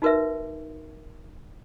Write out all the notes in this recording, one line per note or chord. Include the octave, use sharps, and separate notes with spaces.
D#4 F#4 A#4 B4 E5